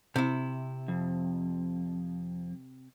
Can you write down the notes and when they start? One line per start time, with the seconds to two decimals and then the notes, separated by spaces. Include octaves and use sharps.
0.16 C3 E4
0.88 F2